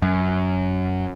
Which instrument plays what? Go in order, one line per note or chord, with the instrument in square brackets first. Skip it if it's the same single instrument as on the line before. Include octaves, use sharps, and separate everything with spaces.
[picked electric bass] F#2